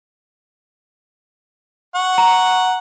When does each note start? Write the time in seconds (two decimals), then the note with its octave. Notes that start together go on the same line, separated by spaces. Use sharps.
1.95 F#5 C#6
2.18 A#5